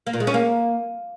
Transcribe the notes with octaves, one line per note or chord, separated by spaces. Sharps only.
A#3
A#2
G#3
C#4
A#3